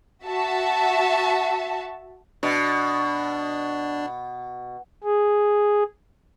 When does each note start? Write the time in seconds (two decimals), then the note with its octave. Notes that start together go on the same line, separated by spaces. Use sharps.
0.25 F#4 E5 A5
2.43 B2 D4
5.04 G#4